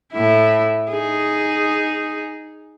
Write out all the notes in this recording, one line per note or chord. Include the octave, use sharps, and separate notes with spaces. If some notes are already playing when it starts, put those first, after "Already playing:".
A2 E4
D#4 G#4